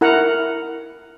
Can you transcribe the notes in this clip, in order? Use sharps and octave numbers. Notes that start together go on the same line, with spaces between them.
E4 A#4 F#5 A#5